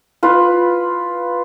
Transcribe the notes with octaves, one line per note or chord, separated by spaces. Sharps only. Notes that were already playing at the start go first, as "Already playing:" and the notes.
F4 B4